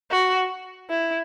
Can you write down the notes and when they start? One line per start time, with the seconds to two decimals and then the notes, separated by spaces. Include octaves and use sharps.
0.10 F#4
0.90 E4